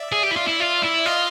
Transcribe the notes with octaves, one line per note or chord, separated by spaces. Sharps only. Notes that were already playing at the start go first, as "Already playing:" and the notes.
Already playing: D5 E5
G#4
G4
E4
F4
E4
F4
E4
F4 D#5 F5